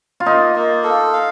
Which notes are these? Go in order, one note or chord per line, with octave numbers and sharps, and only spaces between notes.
F4
A#3 D#4
A#3
A4
F5